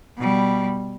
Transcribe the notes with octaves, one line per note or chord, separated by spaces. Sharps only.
B2 G3